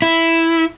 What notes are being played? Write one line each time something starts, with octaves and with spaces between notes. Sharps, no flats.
E4